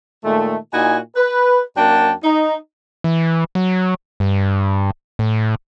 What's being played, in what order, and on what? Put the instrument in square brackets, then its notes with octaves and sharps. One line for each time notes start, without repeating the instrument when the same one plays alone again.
[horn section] A#2 D#3 G#3 A3
A#2 D#4 E4 F#4 G#5
B4
F#2 A#3 D4 F#4 G5 A5
D#4
[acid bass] E3
F#3
G2
A2